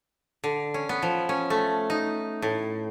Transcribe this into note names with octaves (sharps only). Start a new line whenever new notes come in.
D3
C#4
B3
F3
C#4
A3
D#4
A2